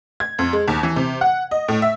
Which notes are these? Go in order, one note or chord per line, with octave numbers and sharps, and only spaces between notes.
G#6
F2
G#3
D#2
E3
C3
F#5
D#5
A2
E5